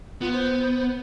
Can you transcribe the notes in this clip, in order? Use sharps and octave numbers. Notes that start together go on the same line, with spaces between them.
B3 F4
C5